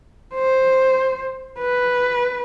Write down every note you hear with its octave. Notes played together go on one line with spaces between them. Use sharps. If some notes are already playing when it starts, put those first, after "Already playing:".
C5
B4